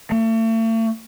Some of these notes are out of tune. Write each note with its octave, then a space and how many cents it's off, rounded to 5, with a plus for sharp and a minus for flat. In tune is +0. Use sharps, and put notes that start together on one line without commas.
A3 +40